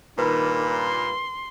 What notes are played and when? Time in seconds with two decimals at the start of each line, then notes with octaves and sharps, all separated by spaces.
0.19 G2 A#2 D#3 B4 B5
0.76 C6